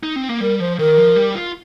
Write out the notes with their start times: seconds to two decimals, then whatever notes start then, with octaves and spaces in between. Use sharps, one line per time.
0.03 D#4
0.16 C4
0.28 A#3
0.40 G3 A#4
0.60 F3 C5
0.79 D#3 A#4
0.98 F3
1.16 G3
1.35 F4